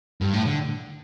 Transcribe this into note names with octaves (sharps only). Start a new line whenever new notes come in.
G2
A2
D3